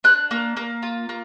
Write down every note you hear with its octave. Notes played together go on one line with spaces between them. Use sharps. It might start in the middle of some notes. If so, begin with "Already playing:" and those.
D4 F#6
A#3
A#3
F4
A#3